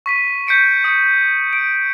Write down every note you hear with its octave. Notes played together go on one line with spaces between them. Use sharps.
C#6 B6 D#7
G6 B6 C#7 D7
D#6 C#7
D7